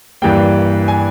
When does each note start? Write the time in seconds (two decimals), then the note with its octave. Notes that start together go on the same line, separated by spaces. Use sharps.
0.22 G2 E3 G3 A#3 G5
0.88 G#5